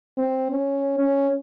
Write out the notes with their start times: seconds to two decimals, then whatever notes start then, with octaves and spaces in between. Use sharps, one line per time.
0.17 C4
0.51 C#4
0.99 C#4